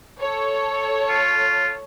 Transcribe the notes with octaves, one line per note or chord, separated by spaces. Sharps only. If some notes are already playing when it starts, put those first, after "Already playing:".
A4 C#5
F4